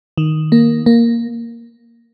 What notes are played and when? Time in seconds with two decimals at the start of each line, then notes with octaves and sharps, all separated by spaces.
0.18 D#3
0.52 A#3
0.86 A#3